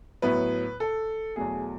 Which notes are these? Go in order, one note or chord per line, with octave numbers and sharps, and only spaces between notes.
A2 F#3 B3 E4 B4
A4
E2 B2 F#3 A3 G#4